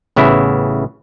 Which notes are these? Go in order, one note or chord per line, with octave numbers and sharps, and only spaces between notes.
A1 C#3 B3 E4 E5